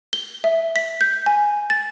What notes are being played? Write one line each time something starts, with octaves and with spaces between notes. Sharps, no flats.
G7
E5
B6
G6
G#5
A6